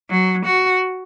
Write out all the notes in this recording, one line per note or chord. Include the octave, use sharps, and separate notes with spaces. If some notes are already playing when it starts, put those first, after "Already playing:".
F#3
F#4